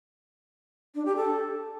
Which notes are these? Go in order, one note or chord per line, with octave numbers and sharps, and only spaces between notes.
D4
G4
A4